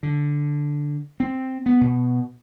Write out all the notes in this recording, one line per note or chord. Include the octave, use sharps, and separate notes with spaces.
D3
C4
B3
B2